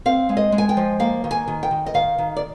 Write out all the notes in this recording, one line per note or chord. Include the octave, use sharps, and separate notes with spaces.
C4 F5
G#3
D#5
G#3
G#5
G5
F3
A#3 F5
D#3
G#5
D#3
G5
D#3
D#5
D#3 F5
D#3
D5